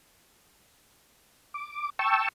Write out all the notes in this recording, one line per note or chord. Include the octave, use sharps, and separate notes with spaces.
D6
G5 A5 C#6 E6